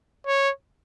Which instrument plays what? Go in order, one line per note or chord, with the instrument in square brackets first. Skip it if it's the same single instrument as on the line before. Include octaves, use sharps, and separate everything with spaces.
[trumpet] C#5